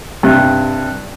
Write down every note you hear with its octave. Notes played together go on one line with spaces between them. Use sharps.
G2 C3